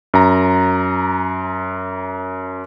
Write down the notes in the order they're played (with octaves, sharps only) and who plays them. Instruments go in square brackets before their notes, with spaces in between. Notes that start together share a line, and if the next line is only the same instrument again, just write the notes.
[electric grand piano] F#2 A#5